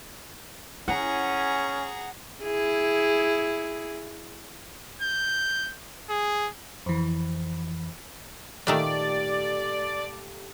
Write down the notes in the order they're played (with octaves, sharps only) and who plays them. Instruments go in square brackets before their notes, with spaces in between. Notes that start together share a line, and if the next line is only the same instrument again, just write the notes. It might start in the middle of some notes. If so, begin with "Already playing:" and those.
[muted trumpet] C#4 [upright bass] E4 [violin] G#4 A#5 [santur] F#5
[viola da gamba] E4 G#4
[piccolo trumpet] G6
G#4
[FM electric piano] F2 E3
[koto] A#2 D#3 A3 [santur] G4 A4 F5 [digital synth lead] D5